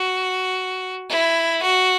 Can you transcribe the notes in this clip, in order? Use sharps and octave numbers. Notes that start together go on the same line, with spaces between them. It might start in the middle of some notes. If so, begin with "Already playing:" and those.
Already playing: F#4
E4
F#4